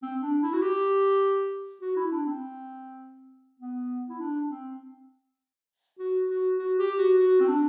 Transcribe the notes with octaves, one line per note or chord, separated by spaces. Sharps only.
C4
D4
E4
F#4
G4
F#4
E4
D4
C4
B3
E4
D4
C4
F#4
F#4
F#4
G4
F#4
F#4
C4
D4